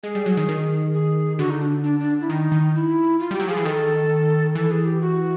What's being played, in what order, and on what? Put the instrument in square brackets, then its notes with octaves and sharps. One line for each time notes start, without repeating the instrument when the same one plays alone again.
[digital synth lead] G#3 [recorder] G#4
[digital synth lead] G3
F#3
D#3
D#3
[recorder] G#4
[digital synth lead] D3 [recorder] F#4
[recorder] D#4
D4
D4
D4
E4
[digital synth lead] D#3 [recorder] D#4
[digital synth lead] D#3
[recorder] E4
F4
[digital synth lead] G3
[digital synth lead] F#3 [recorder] G4
[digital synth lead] F3 [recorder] G#4
[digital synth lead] E3
[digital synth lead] D#3 [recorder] A4
[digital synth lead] E3 [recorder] A4
[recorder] G#4
G4
F#4